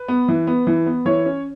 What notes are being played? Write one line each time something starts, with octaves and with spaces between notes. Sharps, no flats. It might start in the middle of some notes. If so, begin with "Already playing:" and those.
Already playing: B4
B3
E3
B3
E3
B3
E3 C#5
C#4